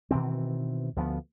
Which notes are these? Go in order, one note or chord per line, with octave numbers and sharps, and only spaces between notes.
B2 D#3 E3 C4
D2 F3 G3 B3